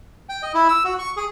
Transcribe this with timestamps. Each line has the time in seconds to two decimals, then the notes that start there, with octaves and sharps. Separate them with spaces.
0.29 G5
0.42 D#5
0.54 E4
0.69 E6
0.85 F#4
0.99 C#6
1.17 G#4